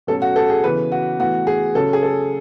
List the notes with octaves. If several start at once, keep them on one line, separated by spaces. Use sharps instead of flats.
B2 F#3 A3 C#4 A4
F#4
A4
G#4
C#3 E3 B3 B4
F#4
A2 E3 B3 F#4
G#4
C#3 F#3 C#4 A4
G#4
A4